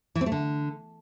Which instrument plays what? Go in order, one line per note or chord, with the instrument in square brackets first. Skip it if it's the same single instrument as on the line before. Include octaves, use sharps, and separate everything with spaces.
[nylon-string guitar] E3
C4
A3
D3